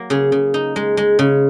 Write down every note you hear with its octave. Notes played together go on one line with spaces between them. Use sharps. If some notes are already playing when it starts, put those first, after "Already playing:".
Already playing: F#3 A#3
C#3 G#4
C#3
D#4
G#3
G#3
C#3